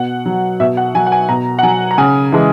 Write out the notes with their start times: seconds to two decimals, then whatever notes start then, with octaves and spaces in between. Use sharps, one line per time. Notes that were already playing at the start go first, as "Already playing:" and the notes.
Already playing: B2 F#5
0.26 F#3
0.60 B2 E5
0.77 F#5
0.95 F#3 G#5
1.07 F#5
1.12 G#5
1.29 B2 A#5
1.59 F#5
1.63 F#3 G#5
1.91 A#5
1.98 C#3 G#5
2.32 E3 G#3